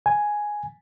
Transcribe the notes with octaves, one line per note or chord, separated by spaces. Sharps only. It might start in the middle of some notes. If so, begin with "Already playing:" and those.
G#5